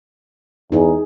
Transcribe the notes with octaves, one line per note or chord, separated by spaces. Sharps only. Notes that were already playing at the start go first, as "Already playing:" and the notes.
E2 D#4 G#4